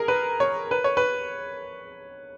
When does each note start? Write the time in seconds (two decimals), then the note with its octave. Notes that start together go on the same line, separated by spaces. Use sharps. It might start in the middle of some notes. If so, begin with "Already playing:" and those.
Already playing: G#4 A#4
0.08 B4
0.40 C#5
0.71 B4
0.84 C#5
0.97 B4